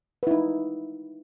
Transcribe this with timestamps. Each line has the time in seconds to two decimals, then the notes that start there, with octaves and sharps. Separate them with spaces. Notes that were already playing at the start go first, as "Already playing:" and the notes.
0.23 B4
0.27 E4
0.31 D#4